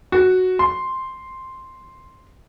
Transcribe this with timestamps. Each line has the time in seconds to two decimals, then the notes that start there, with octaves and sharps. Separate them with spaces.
0.12 F#4
0.59 C6